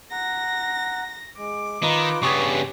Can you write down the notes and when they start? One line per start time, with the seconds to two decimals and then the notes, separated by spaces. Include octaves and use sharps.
0.12 F#5 A#5 A#6
1.37 G#3 D6
1.83 D#3 F4 B4 D#5 A#5
2.23 G2 C#3 B3 C#4 G4 C#6 D#6 G#6